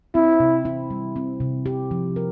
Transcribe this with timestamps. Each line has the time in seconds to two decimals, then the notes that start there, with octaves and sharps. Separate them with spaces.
0.15 C4 E4
0.40 C3
0.65 E4
0.90 G3
1.16 C4
1.40 C3
1.66 G4
1.91 F3
2.16 A#4